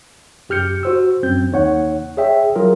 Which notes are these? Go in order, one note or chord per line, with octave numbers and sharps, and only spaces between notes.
F#2 G4 F6 G6 C#7
F#4 C5 E6
F#2 C4 G6
D#2 D#4 C#5 F#5
G#4 C#5 E5 G5
F#3 F4 G#4 A#4